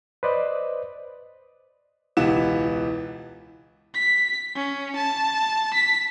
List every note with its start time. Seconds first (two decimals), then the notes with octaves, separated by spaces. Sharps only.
0.23 B4 C5 D5 D#5
2.17 E1 C#2 E3 B3 G4 E7
3.95 B6
4.55 C#4
4.96 A5
5.74 B6